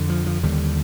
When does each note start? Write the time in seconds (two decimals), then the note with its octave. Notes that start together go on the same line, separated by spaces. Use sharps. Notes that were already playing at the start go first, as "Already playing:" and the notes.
Already playing: F2 D3
0.09 F3
0.26 F3
0.43 D#2 D3 G3